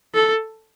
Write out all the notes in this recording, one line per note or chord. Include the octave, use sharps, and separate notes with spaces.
A4